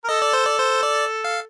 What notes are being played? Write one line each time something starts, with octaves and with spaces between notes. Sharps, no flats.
A#4
A4 D#5
D5
C5
D5
C5
D5
F5